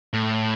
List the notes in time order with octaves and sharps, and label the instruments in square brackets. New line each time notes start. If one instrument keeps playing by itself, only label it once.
[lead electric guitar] A2